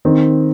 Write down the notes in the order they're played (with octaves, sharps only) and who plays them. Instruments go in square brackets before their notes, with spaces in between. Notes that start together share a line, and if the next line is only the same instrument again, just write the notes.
[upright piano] D#3 C4